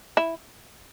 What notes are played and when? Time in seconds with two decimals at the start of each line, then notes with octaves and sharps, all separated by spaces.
0.17 E4